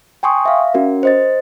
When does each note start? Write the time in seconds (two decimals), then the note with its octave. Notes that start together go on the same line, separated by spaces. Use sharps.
0.23 G5 G#5 C6 C#6 D#6
0.45 E5 F5
0.74 C#4 F#4 A#4
1.03 C5 D#5 A6